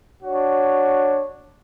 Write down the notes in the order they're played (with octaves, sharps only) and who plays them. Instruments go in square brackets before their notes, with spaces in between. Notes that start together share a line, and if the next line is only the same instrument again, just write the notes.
[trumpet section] D4 F#4 C#5